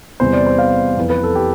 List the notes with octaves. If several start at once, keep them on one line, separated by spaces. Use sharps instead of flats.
E2 C3 G3 C5
D5
C5
F5
F2 E3 B3
B4
A4
G4